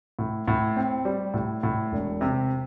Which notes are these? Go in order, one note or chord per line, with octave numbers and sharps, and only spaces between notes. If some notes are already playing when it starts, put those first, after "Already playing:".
A2
A2
C4
G3
A2
A2
E1
C3